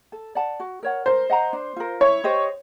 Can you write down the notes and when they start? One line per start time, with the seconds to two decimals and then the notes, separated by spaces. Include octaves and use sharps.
0.12 A4
0.35 D5 F#5 A5
0.60 F#4
0.83 A#4 C#5 F#5
1.06 A#4 C5
1.30 D#5 F#5 A#5
1.53 D4
1.76 F4 A#4
2.01 E4 C#5
2.24 G4 C5 D#5